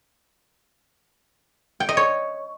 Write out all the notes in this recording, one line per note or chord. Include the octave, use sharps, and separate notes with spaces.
G5
D#5
C#5